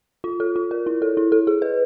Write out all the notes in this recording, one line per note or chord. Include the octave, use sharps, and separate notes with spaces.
F4
A4
F4
A#4
E4
A4
E4
A4
G#4
B4